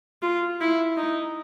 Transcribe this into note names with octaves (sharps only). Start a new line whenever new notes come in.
F4
E4
D#4